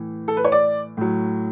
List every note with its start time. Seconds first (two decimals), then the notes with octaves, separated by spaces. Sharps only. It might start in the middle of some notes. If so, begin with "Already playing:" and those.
Already playing: A2 E3
0.28 A4
0.37 B4
0.45 C#5
0.52 D5
0.97 A2 F#3